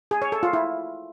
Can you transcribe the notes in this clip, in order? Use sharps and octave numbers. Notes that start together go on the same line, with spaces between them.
G#4
C#5
A4
F4
E4